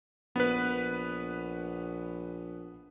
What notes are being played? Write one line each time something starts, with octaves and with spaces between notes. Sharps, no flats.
A#1 B3 B4